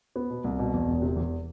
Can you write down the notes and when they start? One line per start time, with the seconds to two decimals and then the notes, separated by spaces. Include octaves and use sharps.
0.16 B3
0.30 B2
0.44 C2
0.59 B2
0.74 E2
0.88 E1
1.02 C3
1.16 E2